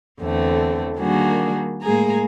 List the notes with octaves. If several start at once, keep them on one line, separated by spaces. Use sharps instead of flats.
E2 D3 A3 C4
D#3 G3 A#3 D4 F#4 G#4
A2 G#3 A#3 G#4 G#5 A#5